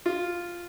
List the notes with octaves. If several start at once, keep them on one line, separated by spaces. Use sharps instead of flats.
F4